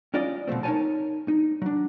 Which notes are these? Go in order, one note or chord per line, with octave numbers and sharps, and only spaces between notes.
C#4 F4 D5 D#5
B2 F3 A3 C4
D#4 A#4 C5 C#5 G#5 A5
D#4
F#3 D4